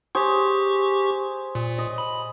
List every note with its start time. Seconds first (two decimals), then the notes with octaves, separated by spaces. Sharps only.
0.15 G4 G#4 C5 C#6
1.55 A#2
1.78 D#5
1.98 B5